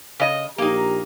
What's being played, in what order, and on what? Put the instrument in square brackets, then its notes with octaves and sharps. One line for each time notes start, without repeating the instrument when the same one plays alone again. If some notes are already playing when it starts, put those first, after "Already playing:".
[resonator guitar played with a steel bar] C#3 D#5
[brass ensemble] A#1 G4 A#5 [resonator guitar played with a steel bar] A#3 D#4